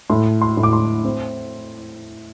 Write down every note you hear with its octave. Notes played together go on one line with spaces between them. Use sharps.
A2 C6
C6
A2
D6
C6
C4